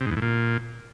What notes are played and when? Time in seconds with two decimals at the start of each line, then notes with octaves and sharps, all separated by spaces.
0.01 C3
0.06 G#2
0.11 E2
0.17 A2
0.22 A#2